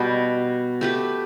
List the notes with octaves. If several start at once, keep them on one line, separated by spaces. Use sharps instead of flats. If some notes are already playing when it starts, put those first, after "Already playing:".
Already playing: B2 G3 B3 G4
A3 G4 B4